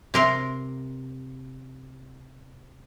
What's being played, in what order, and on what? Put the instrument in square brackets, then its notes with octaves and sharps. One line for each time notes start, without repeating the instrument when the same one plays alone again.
[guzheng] C3 A#4 C6